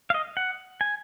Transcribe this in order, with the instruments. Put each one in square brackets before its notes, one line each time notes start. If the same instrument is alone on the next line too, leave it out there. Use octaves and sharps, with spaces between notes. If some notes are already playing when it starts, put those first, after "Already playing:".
[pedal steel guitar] F5
D#5
F#5
G#5